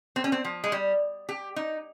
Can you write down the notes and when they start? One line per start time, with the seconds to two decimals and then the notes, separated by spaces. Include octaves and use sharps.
0.16 C4
0.24 C#4
0.32 C4
0.45 F3
0.64 G#3
0.72 G3
1.29 G4
1.56 D#4